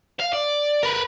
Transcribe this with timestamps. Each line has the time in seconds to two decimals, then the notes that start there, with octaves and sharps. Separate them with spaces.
0.20 F5
0.33 D5
0.83 A#4 B4